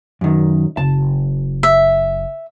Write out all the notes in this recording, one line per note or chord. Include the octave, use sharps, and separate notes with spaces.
F#2 D#3
F#1 A5
E5